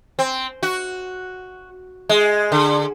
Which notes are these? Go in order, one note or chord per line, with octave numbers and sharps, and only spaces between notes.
C4
F#4
G#3
D3